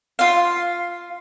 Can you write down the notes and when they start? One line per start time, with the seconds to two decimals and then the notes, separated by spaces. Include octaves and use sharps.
0.19 F4 F5